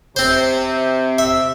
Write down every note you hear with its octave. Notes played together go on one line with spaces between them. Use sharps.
C3 C4 C5
E5